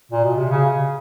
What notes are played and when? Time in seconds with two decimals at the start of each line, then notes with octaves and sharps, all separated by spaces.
0.12 A#2
0.24 B2
0.37 C3
0.50 C#3